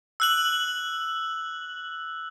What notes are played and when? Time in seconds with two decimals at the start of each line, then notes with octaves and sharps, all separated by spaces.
0.20 E6 F#6 F#7